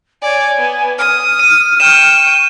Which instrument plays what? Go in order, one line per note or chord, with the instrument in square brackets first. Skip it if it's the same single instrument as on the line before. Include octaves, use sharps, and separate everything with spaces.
[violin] C#5 D5 [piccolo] G#5
[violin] B3
[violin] D#6 [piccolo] F6
[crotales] D#7
[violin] G5 C#6 [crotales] E7